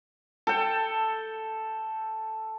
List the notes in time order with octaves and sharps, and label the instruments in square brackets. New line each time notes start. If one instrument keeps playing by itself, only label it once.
[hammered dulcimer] A4 G5